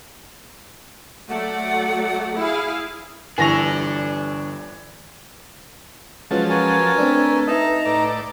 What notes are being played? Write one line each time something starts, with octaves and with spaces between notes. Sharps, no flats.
F#3 A3 D5 F#5
E4 G#4 F5
G1 E3 D4 A4 G#5 C#6 A#6 F7
F3 F#3 G#3 C#4 F4 B4 A5
A#4 C#5 G#5
A3 C4 D4
D#4 D#5 E5 A5 A#5
A2 D5